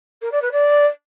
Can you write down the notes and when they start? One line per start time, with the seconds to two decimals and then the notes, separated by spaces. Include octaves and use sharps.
0.21 A#4
0.31 D5
0.41 B4
0.52 D5